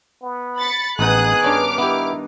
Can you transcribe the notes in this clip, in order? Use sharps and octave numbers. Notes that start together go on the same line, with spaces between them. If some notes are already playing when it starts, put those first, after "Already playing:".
B3
B5 A6 C#7
A1 D#3 B3 D#4 G#4 D#6 F#6
G2 C#4 D4 D6 F6
B3 E4 G4